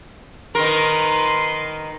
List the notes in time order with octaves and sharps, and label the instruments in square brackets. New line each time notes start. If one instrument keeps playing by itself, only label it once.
[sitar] D#3 A#4 [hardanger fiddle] B4 C6